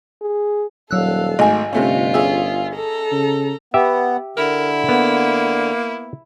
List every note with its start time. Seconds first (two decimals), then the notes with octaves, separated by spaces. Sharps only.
0.21 G#4
0.91 D#1 F#3 A4 F5 E6 F#6
1.39 G#1 A3 D#5 G#5
1.73 G1 C3 A3 C#4 F4
2.14 C#4 G#4 E5
2.76 A4 A#5
3.12 C#3
3.74 B3 G4 E5
4.37 D3 E4 A#4
4.89 A#3 B3